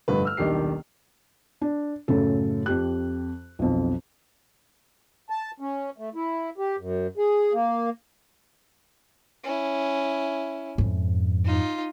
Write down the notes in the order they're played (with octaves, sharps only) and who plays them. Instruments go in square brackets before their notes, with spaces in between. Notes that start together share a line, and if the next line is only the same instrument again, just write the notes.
[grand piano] F1 G2 D3 B4
E6 F6
D#1 B1 D#3 D4 G4 C7
[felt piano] D4
F#2 A2 C#3 A4
F2 G4 F#6
B1 F2
[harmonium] A5
C#4
A3
E4
G4
F#2
G#4
A#3
[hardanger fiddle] C#4 E4
[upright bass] F2 G#2
[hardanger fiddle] D#4 F4